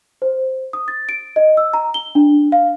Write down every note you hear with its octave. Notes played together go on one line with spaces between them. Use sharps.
C5
D#6
A6
D7
D#5
E6
A#5
G7
D4
F5